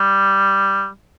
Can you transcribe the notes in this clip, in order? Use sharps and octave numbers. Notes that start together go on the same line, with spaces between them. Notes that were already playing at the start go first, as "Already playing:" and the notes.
Already playing: G3